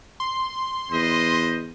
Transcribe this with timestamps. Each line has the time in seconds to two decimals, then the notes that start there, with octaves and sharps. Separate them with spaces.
0.20 C6
0.91 E2 B4 C5 D#5